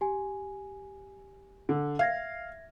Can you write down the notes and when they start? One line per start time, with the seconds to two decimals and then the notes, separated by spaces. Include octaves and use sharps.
0.01 G4 G#5
1.69 D3
1.99 E5 F5 G#6 A#6